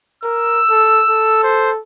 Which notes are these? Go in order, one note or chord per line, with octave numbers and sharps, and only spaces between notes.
A#4 E6
A4
A4
C5